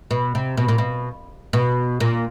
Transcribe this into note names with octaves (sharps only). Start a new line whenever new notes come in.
B2
C3
B2
A#2
B2
B2
A#2